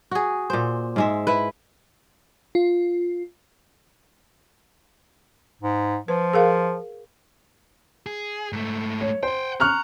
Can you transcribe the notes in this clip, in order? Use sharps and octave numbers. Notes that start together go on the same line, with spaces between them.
F#4 G#4
A#2 C5
G#2 G#3 E5
E4 B4
F4
G#2
F3 B4
G#4 A#4 F5
G#4
G#2 A3
C#5
C5 F#5 G5
A#5 C#6 F6 F#6